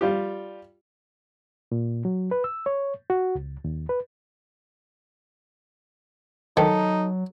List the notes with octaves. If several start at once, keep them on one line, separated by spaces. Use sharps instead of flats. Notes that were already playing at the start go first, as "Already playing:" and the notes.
G3 F4 G4
A#2
F#3
B4
E6
C#5
F#4
C#2
D#2
B4
D#3 F#3 D#4 A4